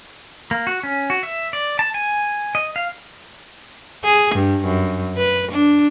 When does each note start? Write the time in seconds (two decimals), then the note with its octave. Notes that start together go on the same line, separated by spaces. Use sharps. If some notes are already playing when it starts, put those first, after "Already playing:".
0.51 A#3
0.67 F#4
0.83 C#4
1.10 F#4
1.23 E5
1.53 D5
1.79 A5
1.94 G#5
2.55 D#5
2.76 F5
4.04 G#4
4.35 G2
4.65 F#2
5.17 B4
5.52 D4